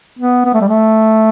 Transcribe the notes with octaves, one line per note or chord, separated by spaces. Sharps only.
B3
B3
A3
G3
A3